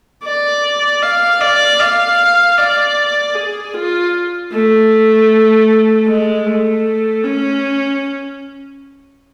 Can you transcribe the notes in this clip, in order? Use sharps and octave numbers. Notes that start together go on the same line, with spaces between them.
D5
F5
D5
F5
D5
G#4
F4
A3
G#3
A3
C#4